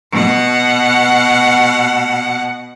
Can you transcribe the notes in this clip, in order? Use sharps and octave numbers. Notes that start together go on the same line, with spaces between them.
B2 F#5